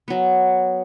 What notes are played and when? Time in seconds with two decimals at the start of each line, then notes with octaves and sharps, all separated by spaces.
0.08 F#3 B3